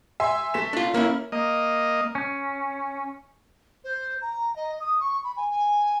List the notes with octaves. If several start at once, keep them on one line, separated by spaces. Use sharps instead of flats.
E5 G#5 C6
A3 B6 E7
D4 F4
A#3 C#4 E4 F6
A#3 D#5
C#4
C5
A#5
D#5
D#6
C#6
B5
G#5
G#5